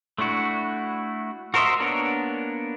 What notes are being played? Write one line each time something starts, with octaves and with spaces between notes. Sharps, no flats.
A3 D4 E4 F#4
F#4 A#4 C5 D#5 E5
A#3 B3 D4 A#4 C#5